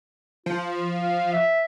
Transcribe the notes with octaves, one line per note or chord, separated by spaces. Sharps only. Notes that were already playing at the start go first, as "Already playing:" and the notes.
F3 F4
F5
E5